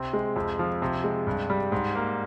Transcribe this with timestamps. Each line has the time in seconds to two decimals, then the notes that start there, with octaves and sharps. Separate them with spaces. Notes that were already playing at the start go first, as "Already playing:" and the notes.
Already playing: C3 C4
0.13 G#3
0.36 F2
0.59 F3
0.82 C3
1.04 G#3
1.27 G2
1.50 G3
1.72 G#2
1.95 A#3